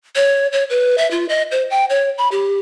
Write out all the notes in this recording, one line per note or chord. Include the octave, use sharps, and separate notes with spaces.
C#5
C#5
B4
E5
F4
D#5
C5
G5
C#5
B5
G4